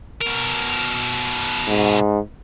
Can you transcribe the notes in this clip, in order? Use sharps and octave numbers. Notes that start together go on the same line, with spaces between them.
B2 A#4
G#2